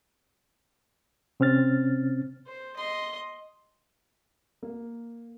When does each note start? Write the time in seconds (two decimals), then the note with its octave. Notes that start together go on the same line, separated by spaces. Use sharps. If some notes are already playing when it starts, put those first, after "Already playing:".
1.40 C3 C4 C#4 F6 A6
2.47 C5
2.76 D#5 C6
4.63 A#3